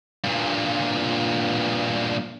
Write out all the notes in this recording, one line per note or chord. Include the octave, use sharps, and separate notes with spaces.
G2 A#2